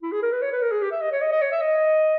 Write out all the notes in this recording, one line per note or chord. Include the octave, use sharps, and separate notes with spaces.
E4
G#4
A#4
B4
C#5
B4
A#4
G#4
G4
E5
D#5
C#5
D#5
D#5
C#5
E5
D#5